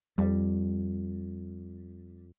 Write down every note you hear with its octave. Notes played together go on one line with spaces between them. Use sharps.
F2 G3